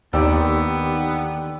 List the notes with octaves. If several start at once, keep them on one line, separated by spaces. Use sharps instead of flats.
D#2 D3 D#3 B3 G4 D5 E6